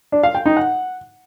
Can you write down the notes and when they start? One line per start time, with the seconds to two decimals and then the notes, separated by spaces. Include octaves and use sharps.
0.12 D4
0.23 F5
0.35 G5
0.46 D#4
0.57 F#5